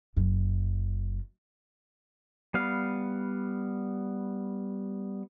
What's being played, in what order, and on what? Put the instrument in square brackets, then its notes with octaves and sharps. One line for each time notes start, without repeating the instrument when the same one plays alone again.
[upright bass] F#1 F#2
[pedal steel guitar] G3 B3 F5